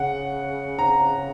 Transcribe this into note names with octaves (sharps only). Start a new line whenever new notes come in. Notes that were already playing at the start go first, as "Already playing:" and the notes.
Already playing: C#3 F#5
A#5